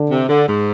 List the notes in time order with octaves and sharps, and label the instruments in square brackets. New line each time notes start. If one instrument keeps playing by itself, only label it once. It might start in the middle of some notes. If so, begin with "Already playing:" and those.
Already playing: [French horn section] D3
[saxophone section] C3
D3
G#2